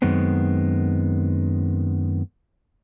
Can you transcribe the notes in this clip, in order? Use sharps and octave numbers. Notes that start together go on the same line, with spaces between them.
F#2 D#3 G#3 B3 C4